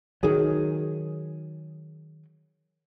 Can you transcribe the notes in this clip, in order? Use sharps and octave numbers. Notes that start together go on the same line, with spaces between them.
D#3 F#3 G#4